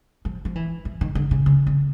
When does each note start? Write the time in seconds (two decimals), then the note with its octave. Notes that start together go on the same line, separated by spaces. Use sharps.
0.25 F3
0.45 F3
0.55 E3
0.85 E3
1.01 D#3
1.15 D3
1.31 C#3
1.46 C#3
1.67 C#3